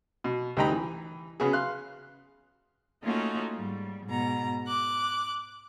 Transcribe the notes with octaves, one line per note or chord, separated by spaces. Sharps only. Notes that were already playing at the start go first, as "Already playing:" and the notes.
B2
D2 G3 D#4 G5 A#5 B5
E3
C#3 B3 F#4 G#4
F5 C6 F#6
A3 A#3 C#4 D#4 F4 F#4
G#2 G3
G#2 B2 A#5
D6 F#6